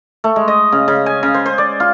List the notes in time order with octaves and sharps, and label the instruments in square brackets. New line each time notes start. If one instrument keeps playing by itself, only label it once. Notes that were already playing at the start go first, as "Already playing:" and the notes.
[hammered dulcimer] A3
G#3
D#5
C#3
C#3
G#5
C#3
C5
C5
D5
F4